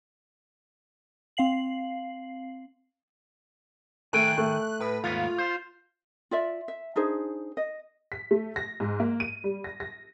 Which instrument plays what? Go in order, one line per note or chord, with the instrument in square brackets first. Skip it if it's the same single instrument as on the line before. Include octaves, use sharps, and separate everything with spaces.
[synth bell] C4 F5 C7 F#7
[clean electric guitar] D#3 G5 G#5 [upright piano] A3 [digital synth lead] F#6
[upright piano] A3
[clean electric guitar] A2 [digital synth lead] B4
[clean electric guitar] D#2 G#2 B3 [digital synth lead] F4
[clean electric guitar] C5
[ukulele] F4 D5 E5
E5
D4 D#4 G#4 C5
D#5
[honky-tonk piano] B6
A3
A#6
G#2
A#3
D#7
G3
A#6
A#6